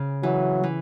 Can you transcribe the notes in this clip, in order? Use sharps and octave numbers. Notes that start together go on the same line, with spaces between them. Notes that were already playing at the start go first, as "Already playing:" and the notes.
Already playing: C#3
E3 F#3
E3